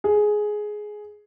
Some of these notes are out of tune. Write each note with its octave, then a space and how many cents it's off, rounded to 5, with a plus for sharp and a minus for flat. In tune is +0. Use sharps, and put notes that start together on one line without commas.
G#4 +10